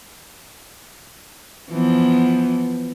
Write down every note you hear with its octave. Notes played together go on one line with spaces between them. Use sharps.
E3 F3 B3